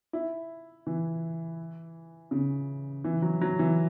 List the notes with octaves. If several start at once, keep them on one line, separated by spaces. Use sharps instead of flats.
E4
E3
C#3
E3
F#3
F#3
E3